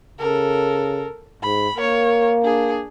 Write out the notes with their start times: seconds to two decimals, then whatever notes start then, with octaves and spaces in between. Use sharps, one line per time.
0.19 C#3 A4 A#4
1.42 G#2 B5
1.76 A#3 A#4 C#5
2.43 D4 G#4